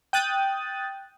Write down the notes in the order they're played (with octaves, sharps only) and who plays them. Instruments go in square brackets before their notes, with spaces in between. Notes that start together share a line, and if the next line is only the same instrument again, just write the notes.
[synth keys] G5 D#6 F#6 A6